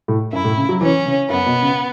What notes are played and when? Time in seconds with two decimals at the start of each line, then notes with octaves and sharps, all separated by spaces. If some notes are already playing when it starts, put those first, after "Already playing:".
0.08 A2
0.33 F#2 E4
0.44 A2
0.57 C#3
0.69 F#3
0.81 E3 C#4
1.06 C#3
1.30 F#2 B3
1.46 B2
1.62 C#3